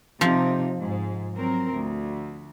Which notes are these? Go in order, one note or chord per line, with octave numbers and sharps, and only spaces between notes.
C3 F3 D#4
G#2
F#3 C4 A#4
D2